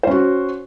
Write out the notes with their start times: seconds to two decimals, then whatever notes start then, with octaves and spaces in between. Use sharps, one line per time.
0.03 C5
0.07 C#4
0.11 F#4